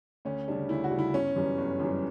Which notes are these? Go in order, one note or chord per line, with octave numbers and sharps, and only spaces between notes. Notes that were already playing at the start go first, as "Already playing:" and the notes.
D2 C#4
C#3 G3 D4
D2 E4
F#4
C#3 G3
E4
G1 C#4
F#2 E3 G3
G1
F#2 E3 G3